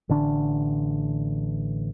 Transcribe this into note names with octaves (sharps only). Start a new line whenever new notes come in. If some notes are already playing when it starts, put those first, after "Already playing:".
A1 D3 D4